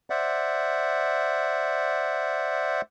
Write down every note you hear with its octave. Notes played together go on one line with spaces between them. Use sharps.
C5 D5 E5 F#5